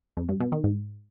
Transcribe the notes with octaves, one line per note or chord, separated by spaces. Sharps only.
F2
G2
B2
D#3
G#2